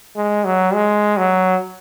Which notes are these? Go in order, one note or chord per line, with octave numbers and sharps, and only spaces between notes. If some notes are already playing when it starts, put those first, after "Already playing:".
G#3
F#3
G#3
F#3